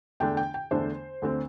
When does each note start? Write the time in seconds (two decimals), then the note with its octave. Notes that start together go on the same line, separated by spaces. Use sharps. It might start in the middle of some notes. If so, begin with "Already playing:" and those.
0.20 E2 D3 A3 D4 G5
0.37 G5
0.54 G5
0.71 E2 D3 A3 D4 C5
1.22 D2 D3 C4